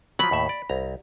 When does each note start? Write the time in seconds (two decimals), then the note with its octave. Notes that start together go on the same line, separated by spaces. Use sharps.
0.19 F3 F#3 B5
0.31 D#2 A2 E5
0.49 D5
0.69 C2 A#5